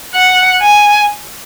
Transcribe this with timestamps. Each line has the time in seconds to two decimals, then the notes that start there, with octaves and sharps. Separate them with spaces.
0.15 F#5
0.62 G#5